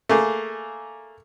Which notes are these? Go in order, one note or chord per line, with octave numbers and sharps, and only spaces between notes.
A3 A#3 G#4